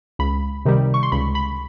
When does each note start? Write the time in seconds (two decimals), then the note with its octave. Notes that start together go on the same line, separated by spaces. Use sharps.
0.19 C#2 B5
0.65 C3 D#3 G3
0.94 C#6
1.03 C6
1.12 C#2 B5
1.35 B5